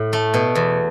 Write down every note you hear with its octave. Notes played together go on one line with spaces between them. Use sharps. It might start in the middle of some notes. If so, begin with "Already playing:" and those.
Already playing: A2
A3
B2
E2